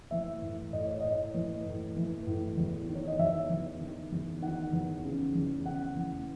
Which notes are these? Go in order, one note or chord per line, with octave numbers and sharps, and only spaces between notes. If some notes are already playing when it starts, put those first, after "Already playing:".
E3 E5
A2
A2 D#5
C#5
A2 D#5
E3
A2
E3
A2
E2
D#3
C#5
D#5
E2 E5
E2
D#3
E2
D#3 F#5
E2
C#3
E2
C#3 F#5
E3